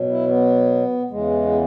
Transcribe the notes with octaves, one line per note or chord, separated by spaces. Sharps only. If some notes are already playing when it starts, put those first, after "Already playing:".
Already playing: B2 F#3
E4
B3
E2 C#3 E3 G#3
B3